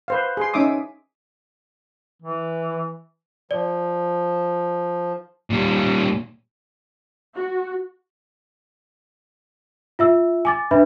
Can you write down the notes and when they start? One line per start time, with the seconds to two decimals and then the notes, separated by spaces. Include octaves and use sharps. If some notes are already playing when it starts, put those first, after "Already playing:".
0.08 B4 C5 F5
0.37 G#4 C6
0.54 C#4 D#4 E5 D6 D#6
2.22 E3
3.51 F3 D5
5.50 A#2 G3
7.35 F#4
9.99 F4 E5 E6
10.45 G#5 D6 A6
10.71 D4 B4 E5 B5